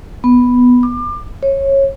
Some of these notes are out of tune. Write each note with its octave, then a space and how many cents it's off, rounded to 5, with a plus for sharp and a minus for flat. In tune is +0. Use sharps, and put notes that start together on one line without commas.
B3 +0
D6 +30
C#5 -20